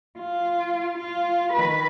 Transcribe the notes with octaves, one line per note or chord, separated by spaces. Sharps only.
F4
F4
D#3 B4